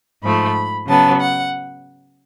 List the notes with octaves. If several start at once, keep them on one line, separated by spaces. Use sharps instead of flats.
G#2 F3 A3 B5
C#3 F#3 B3 A5
F#5